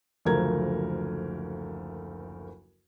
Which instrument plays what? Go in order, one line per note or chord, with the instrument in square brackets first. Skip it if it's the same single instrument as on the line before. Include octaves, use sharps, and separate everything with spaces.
[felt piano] F#1 D2 F3 A3 A#4 G#6